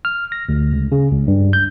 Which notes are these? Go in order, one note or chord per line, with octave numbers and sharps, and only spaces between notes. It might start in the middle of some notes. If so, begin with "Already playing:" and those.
F6
A#6
D2
C#2
C#3
C#2
G2
G6